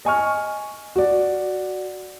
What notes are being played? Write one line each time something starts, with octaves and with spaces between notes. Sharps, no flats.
D#5 G#5 C#6 F6
F#4 D5